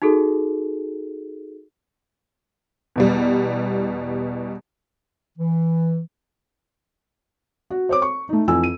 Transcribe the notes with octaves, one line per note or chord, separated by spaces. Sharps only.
D#4 F#4 G#4 A4
E2 B2 G3
E3
F#4
C5 C#5 D6
C#6
A3 D#4
F2 E3 G#5 E6
D#7